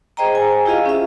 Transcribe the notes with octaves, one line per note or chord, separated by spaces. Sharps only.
G#4 C5 D#5 G5 A#5
G#5
E4 F4 G4 G#4 D#5 F5
C#4 E5